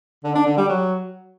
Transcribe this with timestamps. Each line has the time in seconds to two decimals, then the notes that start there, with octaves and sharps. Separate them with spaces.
0.24 D3
0.35 D4
0.46 D3
0.57 G3
0.69 F#3